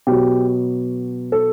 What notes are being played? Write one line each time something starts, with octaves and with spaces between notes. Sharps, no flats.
B2 F#3 G4
A4